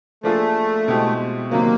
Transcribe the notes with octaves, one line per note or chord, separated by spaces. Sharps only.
F3 A3 A#3 D4 F4 G#4
B2 G#3 C4 E4 G4
C3 D#3 F#3 A#3